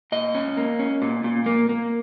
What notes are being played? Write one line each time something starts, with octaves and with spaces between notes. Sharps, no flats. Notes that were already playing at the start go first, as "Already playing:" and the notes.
A#2 D#5
C#4
A#3
C#4
A#2
A#2
A#3
A#3